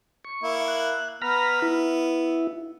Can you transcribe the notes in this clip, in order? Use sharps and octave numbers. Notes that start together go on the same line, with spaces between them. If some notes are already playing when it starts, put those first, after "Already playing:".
C#6
A#3 E4
F#6
B3 A#5 B5 F6
E4